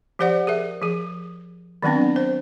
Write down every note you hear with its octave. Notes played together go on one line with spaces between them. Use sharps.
F3 G4 C5 D5 F#5
G#4 A#4 E5
F3 G#4
D#3 F#3 B3 C4 D4
C5